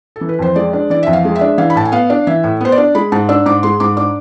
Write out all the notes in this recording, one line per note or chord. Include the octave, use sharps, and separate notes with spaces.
A4
E3
B4
F2 C5
G#3 D5
D4
E3 D5
F2 E5
F5
G#3
E5
D4
E3 F5
B5
A2 A5
G#5
B3 F5
D4
E3 E5
A2
B3 C5
D5
D4
G#3 B5
G#2 A5
D4 E6
G#2 D6
G#3 C6
G#2 D6
D4 D6